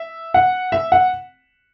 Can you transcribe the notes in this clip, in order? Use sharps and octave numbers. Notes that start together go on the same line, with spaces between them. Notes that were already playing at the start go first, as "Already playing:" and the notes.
Already playing: E5
F#5
E5
F#5